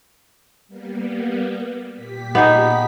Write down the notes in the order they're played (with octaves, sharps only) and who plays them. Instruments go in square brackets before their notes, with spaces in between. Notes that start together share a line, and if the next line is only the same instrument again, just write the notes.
[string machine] G3 A#3 B3
A#2 G4 B6
[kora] B3 D#4 G#4